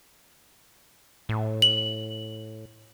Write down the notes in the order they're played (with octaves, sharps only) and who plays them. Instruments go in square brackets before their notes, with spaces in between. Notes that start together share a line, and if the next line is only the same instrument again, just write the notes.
[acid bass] A2
[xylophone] F#7